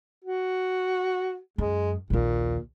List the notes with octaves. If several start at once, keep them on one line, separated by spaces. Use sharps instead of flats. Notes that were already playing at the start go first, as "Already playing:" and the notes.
F#4
F#2 G#3
A#1 D#2 A#2